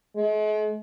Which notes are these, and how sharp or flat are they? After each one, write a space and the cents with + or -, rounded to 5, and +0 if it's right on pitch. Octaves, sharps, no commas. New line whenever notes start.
G#3 +45